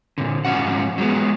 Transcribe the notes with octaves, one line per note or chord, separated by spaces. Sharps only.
A#2 D3
G#2 F3 C#4 F#4 F#5
F#3 G#3 B3